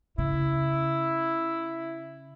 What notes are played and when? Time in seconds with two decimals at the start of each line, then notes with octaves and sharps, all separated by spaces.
0.18 C#3 E4